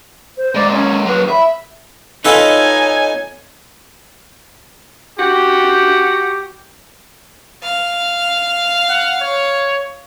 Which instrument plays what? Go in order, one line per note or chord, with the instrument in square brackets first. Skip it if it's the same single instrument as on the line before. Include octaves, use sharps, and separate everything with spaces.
[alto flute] C5
[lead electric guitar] G#3 A#3 [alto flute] D5
[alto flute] C#4
[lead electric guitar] F#3 A#3 [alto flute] B4
[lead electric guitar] E5 [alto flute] B5
[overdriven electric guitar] D#4 [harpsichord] F4 A4 B4 [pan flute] C#5 [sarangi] G#5
[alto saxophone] F#4 [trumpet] G4
[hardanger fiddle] F5
[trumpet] F#5
C#5